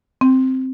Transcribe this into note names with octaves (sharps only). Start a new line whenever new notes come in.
C4